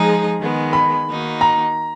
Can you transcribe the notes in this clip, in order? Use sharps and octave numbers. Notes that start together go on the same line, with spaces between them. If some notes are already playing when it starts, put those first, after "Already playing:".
Already playing: F3 G#3 D#4 G#4 A#5
D#3 G#3 B3
B5
D#3 A#3 D#4 F#4
A#5